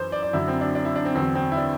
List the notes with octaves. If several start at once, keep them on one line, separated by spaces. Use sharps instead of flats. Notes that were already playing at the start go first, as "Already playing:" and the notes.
Already playing: F#2 E3 C5
D5
D5
F#2 D3 F#3 E4
C4
D4
D4
E4
D4
C4
E2 D3 F#3 C4
C4
E4
D4